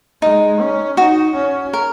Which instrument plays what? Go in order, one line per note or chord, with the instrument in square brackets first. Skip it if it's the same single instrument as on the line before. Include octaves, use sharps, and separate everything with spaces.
[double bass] G#3 [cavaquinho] D#4
[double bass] C#4
[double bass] D#4 [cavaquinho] F#4
[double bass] C#4
[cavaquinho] A#4